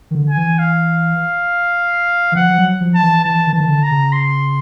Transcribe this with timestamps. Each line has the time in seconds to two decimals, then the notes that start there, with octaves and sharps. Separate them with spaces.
0.11 D#3
0.15 D3
0.30 G#5
0.37 E3
0.59 F5
2.32 E3
2.35 F3 F#5
2.49 F3
2.58 F#3
2.80 F3
2.95 A5
3.02 E3
3.24 E3 A5
3.47 D#3
3.53 E3 A5
3.60 D#3
3.68 D3
3.83 A#5
3.91 C#3
4.13 C6